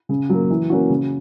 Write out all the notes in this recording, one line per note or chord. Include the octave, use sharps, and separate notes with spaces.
C#3
F#3 A#3
E3
A#3 C#4 F#4
C#3